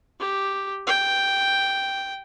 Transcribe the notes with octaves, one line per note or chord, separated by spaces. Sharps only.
G4
G5